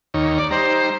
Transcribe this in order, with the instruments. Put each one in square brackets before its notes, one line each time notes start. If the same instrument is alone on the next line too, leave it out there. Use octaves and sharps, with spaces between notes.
[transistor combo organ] D#2 D#4 C#5
[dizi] D5
[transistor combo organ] G3 D#4 A#5 [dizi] C5